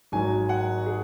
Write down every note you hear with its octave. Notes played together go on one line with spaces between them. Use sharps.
G#1 G#2 F#3 G#5
F#5
G#4